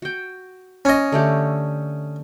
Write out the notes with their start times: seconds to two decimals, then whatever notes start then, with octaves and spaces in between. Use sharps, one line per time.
0.02 F#4 G5
0.85 C#4 D#5
1.12 D3 A3 G4